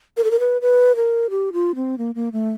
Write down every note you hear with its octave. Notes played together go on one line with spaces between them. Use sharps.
A#4
A4
A#4
B4
B4
A#4
G4
F4
C4
A#3
A#3
A3